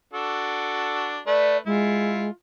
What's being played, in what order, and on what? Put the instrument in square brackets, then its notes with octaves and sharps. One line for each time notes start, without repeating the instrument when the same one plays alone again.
[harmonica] D4 F#4 A4
[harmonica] A3 B4 [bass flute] D5
[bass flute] G#3 [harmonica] E4 F4